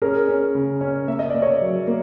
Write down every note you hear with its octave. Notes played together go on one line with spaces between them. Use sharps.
C#4 G#4 A#4
C#4
C#3
C#4
A#3 E5
D#5
A#3 D5
C#5 D#5
F#3
A#3